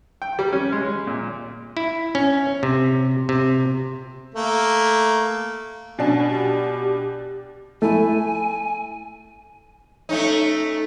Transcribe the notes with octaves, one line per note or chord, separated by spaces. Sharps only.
G5
G3
C#4
G#3
A#2
E4
C#4
C3
C3
A3 A#3
B2 D4 G#5
G4
A3 E4 G#5
A3 C#4 D#4